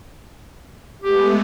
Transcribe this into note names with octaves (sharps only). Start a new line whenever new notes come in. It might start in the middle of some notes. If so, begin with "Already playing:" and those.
G#3 A3 B3 G4